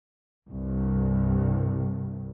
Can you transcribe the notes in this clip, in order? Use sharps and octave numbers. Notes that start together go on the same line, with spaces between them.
C2 G2